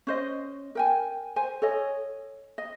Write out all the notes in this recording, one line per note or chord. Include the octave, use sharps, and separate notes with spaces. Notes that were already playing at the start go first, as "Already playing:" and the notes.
C#4 C5 D#5
A#4 G5 G#5
C5 G#5
A4 C#5 D#5
D#5